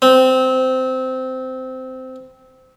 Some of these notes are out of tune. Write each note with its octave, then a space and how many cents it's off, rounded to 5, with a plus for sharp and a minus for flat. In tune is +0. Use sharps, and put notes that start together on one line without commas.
C4 -15